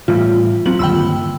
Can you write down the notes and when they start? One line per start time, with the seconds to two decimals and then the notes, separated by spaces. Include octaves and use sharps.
0.08 A2 E3 G3 F4
0.66 F#3 C4 F4 F#7
0.79 G1 D#2 G5 B5 E6